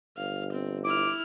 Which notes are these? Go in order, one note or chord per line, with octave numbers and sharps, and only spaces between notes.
G1 F5
C4
E4 D6 F6